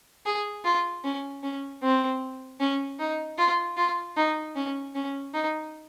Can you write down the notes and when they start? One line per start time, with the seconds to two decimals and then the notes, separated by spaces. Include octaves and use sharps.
0.25 G#4
0.64 F4
1.04 C#4
1.43 C#4
1.82 C4
2.60 C#4
2.99 D#4
3.38 F4
3.77 F4
4.17 D#4
4.56 C#4
4.95 C#4
5.34 D#4